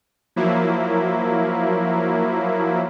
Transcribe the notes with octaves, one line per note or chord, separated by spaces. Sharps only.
F3 F#3 A#3 E4